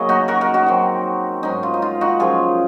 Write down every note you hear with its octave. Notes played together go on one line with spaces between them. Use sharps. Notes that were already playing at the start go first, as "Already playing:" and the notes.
Already playing: F#2 C#3 F#3 A#3 G#4 A#4 D#5
D#4 F#4
F#4 A#4
F#4 A#4
D#4 F#4
D#3 F#3 C4
G#2 F#3 C#4 D#4
F4
D#4
F4
D#4 F#4
F#2 C#3 F3 F4 G#4